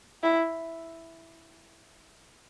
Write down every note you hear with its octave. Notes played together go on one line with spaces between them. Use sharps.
E4